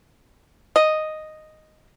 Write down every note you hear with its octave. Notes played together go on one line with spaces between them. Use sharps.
D#5